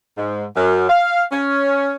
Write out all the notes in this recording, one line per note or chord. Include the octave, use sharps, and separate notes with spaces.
G#2
F#2
F5
C#4